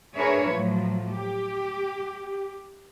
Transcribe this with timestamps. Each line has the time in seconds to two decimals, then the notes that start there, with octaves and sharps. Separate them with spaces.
0.18 D4 G#4 A#4 B4 C#5 E5
0.51 A2 F3 F#3
1.12 G4